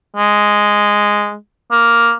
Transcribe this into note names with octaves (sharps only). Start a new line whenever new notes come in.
G#3
A#3